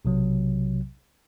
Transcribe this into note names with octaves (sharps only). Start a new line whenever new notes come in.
B1 C3 F#3